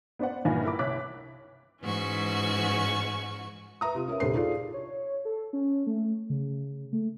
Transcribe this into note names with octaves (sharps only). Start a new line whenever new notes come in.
B3 D4 C5 D5 F#5
A#1 G2 D#3 E3 G#5 A#6
E4 A#4 B5 D6
C2 C#5 D6 F#6 B6
G#2 E3 C#4 F#4 C#6
B4 E5 A#5 D#6
C3 F4
C#4 A#4 B4 E5
D#1 C2 G2 A4 C5 C7
D#4 F4 G#4 A4 D5
C#5
A4
C#4
A3
C#3
A3